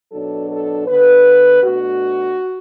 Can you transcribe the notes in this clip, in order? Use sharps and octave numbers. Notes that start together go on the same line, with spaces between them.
B2 F#3 D4 A4
A4
D3 B3 D4 B4
B2 A3 D4 F#4